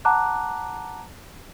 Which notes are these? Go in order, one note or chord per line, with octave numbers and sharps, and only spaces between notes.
F#5 A5 A#5 D6 F#6